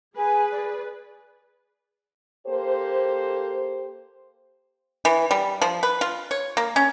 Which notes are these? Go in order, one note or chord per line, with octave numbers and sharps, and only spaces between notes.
G#4 B4 G#5
D5
A#3 G4 A4 C5
E3
G3
F3
B4
F4
C#5
A#3
C#4